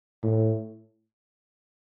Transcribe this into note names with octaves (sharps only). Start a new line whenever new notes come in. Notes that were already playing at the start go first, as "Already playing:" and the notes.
A2